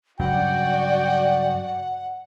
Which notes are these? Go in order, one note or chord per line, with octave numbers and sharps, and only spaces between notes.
G2 C#3 F#3 F#4 D5 F#5 G5